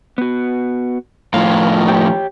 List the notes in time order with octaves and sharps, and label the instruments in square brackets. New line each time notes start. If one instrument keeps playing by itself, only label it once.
[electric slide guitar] B3 F#4
[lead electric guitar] A2 F3 [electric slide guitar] F5
[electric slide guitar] G4 C#5 G5